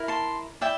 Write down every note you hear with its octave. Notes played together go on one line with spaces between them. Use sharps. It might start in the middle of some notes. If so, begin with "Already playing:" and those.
Already playing: E4 A#4
A5 C6
E4 D5 E5 G5